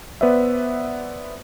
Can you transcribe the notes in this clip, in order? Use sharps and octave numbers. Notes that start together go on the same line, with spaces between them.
B3 B4 C5 D5 E5